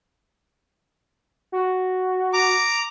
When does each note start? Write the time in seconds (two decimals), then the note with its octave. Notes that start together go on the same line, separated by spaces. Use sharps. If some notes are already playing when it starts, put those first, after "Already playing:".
1.52 F#4
2.33 A#5 D6